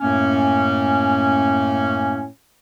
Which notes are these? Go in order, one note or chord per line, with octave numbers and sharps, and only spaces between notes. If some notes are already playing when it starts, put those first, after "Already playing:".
F#2 A2 A3 A#3 C#4